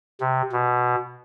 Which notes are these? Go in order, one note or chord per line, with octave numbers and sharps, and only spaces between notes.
C3
B2